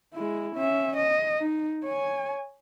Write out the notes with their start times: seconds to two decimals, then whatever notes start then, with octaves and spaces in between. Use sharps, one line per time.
0.14 G#3 E4
0.56 C#4 E5
0.97 D#5
1.39 D#4
1.84 C#5 G#5